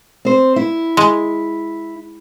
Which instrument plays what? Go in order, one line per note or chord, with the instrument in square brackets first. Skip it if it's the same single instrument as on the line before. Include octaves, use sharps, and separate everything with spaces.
[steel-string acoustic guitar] C4 C5
E4
[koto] G#3